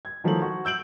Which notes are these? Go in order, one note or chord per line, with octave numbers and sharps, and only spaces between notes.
G#6
D#3 F3 F#3 A3 F#7
F#4
E6 G6 D7 F#7